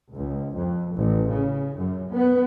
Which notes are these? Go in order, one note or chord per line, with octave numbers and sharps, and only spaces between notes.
C#2
F2
A1
C#3
F#2
B3